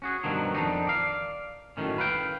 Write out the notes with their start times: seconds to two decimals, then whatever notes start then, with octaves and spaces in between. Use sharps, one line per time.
0.02 C#4 F#4 G#4
0.24 G2 B2 D#3 F3 F#3
0.54 F2 A#2 D#3 D4 D#4
0.87 D5 F5
1.77 F#2 A2 D#3 C#4
1.98 B4 F5 G5